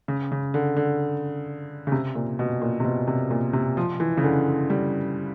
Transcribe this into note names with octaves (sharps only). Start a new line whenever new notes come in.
C#3
C#3
D3
D3
C#3
C3
A#2
B2
A#2
C3
B2
C3
A#2
C3
F3
E3
C#3
D3
G3